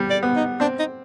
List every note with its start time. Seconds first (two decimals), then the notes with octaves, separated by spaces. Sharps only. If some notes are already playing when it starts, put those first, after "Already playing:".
Already playing: G3
0.10 D5
0.23 B3
0.36 D#4
0.60 C4 D4
0.79 D#4